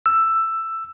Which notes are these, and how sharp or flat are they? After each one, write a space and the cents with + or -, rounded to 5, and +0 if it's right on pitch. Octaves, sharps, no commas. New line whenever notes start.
E6 +10